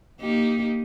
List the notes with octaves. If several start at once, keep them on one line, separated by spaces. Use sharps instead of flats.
A#3 D#4 G4